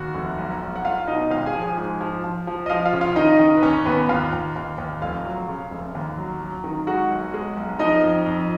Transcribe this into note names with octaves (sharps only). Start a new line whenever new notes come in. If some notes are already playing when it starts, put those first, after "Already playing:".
Already playing: D#2 F#4 F#5
F1
B1
B1
F#5
B1 F4 F5
F5
B2 D#4 D#5
G#1 F4 F5
G#4 G#5
F3
G#4 G#5
G#2
F3
F3
F3
D#5
F3 F4 F5
F4 F5
C#3
F4 F5
D#3 D#4 D#5
D#3
B4
D#2 C#4 C#5
D#2 B3 B4
D#2 F4 F5
D#2
D#2
D#2
F1 F4 F5
F#3
C#3
F1
D#2
F#3
F#3
D#3
G#3 F#4 F#5
B1
G#3
B1
F3 D#4 D#5
F2
F2